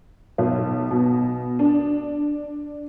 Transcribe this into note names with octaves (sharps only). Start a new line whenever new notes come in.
B1
B2
D4